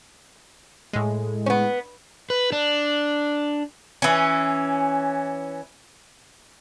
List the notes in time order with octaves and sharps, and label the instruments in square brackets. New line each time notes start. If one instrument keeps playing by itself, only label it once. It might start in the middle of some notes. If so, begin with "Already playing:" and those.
[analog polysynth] A2 G#3
[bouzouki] B3 C#4
[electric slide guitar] B4
D4
[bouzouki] E3 C#4